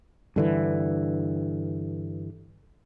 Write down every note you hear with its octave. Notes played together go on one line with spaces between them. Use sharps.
G2 D3 E3